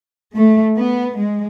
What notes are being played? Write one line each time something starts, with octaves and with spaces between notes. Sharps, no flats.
A3
B3
G#3